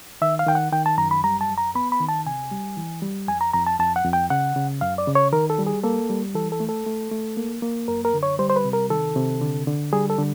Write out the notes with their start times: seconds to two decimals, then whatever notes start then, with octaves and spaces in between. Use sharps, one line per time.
0.21 D#3 E5
0.39 F5
0.47 D#3 G5
0.55 F#5
0.72 D#3 G5
0.86 A5
0.98 F#2 A#5
1.11 B5
1.24 G3 A#5
1.41 A5
1.49 F#2
1.58 A#5
1.75 B3 B5
1.92 B5
2.00 D#3
2.09 A5
2.26 C3 G#5
2.52 G3
2.77 E3
3.02 G3
3.28 F2 G#5
3.41 A#5
3.54 F2 A#5
3.66 A5
3.80 F2 A5
3.96 F#5
4.05 F2
4.13 G5
4.30 C#3 F#5
4.56 C#3
4.81 F#2 F5
4.98 D5
5.07 C#3
5.15 C#5
5.32 D#3 A#4
5.50 A4
5.59 G3
5.67 G#4
5.84 A#3 A4
6.09 G3
6.35 E3 A4
6.52 A4
6.60 A3
6.69 A4
6.86 A3
7.11 A3
7.37 A#3
7.62 A#3
7.88 F#2 A#4
8.05 A#4
8.14 D3
8.23 C#5
8.39 G3 C5
8.50 C5
8.56 B4
8.65 C3
8.73 A#4
8.90 D#3 A4
9.16 C3
9.42 D3
9.67 D3
9.93 G3 G#4
10.10 A4
10.19 D3